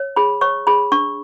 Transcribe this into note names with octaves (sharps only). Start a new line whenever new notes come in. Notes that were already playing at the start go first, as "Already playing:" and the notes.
Already playing: C#5
G#4 B5
C#5 C#6
G#4 B5
D4 C#6